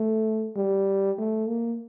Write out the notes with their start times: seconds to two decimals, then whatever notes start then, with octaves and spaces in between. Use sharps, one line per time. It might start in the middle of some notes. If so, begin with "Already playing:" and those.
Already playing: A3
0.56 G3
1.18 A3
1.48 A#3